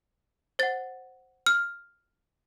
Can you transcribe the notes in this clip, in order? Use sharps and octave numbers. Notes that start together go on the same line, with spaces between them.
C5 F#5 A6
F6